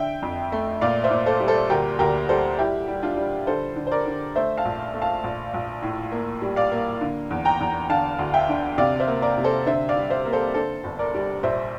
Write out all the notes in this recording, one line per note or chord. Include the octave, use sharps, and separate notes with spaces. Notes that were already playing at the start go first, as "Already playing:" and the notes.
Already playing: D3 E5 G5
F2
A3
A#2 D5 F5
C5 E5
A#2
A4 C5
G3
A4 C5
D2 G4 A#4
D2 G4 A#4
G3 A4 C5
G3 E4 G4
G3
D4 F4
G3
D3 A4 C5
D3
C5
A#4 D5
D3
A3 C5 E5
F5 A5
A#1
A3
F5 A5
A#1
A#1
A2
A#3
G3
D5 F5
A#3
D3
E2
G5 A#5
E2
D3 F5 A5
D2
E5 G5
D3
C3 D5 F5
C5 E5
A#3
A#4 D5
C3
A4 C5
D3 C5 E5
D5 F5
G3
C5 E5
A#3
A4 C5
D3 A4 C5
G1
A#4 D5
G3
A#1 C5 E5